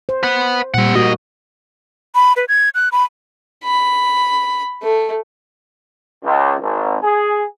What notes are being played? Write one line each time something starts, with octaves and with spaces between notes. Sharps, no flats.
C5
B4 F#5
A#2 G3 C4 F#5
G#2 A#3 F#4 D#5
B5
B4
G#6
F#6
B5
B5
A3
C#2
G#1
G#4